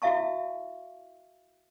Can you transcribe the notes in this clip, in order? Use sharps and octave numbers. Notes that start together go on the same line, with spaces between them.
E4 F#4 E5 F5 A5 C#6